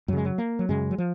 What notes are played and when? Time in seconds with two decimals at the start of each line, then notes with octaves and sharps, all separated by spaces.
0.08 F#2 F#3
0.13 C#3 G#3
0.25 F#3
0.38 A#3
0.59 F#3
0.69 F#2 C#3 G#3
0.91 F#3
0.98 F3